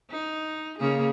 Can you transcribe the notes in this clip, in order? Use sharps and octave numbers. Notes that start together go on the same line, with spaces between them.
D#4
C#3 A#3 G#4